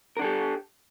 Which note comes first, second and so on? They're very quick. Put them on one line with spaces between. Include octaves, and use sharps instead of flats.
A#4 D4 A4 G4